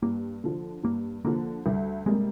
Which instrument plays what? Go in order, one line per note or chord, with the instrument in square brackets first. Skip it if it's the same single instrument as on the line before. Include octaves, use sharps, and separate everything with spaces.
[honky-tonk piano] G2 [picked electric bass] A#3
[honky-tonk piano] D3 F3
[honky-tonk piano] G2 [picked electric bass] A#3
[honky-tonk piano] D3 F3 [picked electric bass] A#3
[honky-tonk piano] D2 [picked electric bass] G3
[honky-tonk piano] C3 G3 A#3 [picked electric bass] G#3